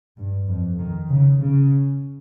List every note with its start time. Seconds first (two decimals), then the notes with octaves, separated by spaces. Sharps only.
0.17 G2
0.48 F2
0.78 D#3
1.08 C#3
1.39 C#3